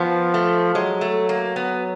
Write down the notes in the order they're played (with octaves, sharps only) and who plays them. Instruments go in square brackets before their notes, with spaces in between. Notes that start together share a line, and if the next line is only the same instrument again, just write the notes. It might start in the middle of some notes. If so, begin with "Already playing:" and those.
Already playing: [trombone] F3 [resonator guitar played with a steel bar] B3
[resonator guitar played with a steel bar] A3
[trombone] F#3 [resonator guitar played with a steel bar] G#3
[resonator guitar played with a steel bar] A3
A#3
B3